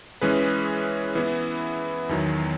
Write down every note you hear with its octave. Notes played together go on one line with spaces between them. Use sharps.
E3 G#3 C#4 G#4 B4
E3 B3 E4
E2 D#3 F#3